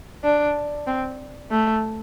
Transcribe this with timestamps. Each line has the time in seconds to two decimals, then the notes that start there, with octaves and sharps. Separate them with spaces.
0.24 D4
0.87 C4
1.51 A3